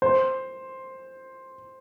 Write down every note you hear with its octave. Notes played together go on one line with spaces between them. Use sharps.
C5